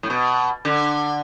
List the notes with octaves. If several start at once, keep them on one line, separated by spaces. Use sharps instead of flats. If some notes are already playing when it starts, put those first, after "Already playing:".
A2
B2
D3